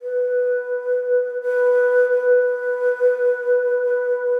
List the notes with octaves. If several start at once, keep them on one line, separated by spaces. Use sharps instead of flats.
B4
B4
B4